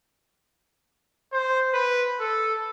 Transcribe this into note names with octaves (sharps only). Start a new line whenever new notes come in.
C5
B4
A4